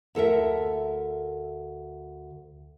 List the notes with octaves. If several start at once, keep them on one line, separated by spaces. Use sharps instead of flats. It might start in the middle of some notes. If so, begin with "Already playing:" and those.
D2 A4 A#4 E5